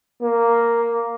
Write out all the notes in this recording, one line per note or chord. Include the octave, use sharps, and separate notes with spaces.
A#3